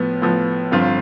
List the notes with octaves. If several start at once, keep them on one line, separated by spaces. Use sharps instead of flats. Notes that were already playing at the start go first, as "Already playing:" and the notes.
Already playing: A2 F3 B3
A2 F3 B3
G1 G2 F3 C4 F4